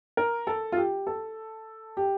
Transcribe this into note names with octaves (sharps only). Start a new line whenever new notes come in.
A#4
A4
F4
G4
A4
G4